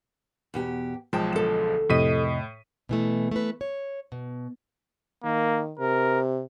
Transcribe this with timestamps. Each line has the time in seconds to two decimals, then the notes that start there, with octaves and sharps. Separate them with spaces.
0.54 E2 B2 G4
1.13 B1 F3 G#3 G5 A5
1.33 D2 A4
1.89 F2 A2 C3 D#5 B6 D#7
2.89 B2 E3 A3
3.31 A3 B4
3.61 C#5
4.12 B2
5.24 D#3 A#3
5.79 C3 A#4